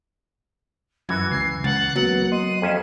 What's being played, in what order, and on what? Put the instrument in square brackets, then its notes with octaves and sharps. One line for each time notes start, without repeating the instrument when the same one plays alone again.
[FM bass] F#2 [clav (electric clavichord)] E3 F#4 [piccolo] G#6
[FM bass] C#2 [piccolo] C7
[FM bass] C#2 [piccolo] F#5 [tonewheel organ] A6
[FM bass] F#3 [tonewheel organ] A#3 B3 [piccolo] F#5
[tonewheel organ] D#5 C6 [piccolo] D#7
[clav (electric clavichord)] F2 C#4 E5 [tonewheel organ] A4